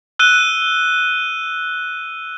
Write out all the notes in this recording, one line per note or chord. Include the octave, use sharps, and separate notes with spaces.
E6 F#6 D#7 G7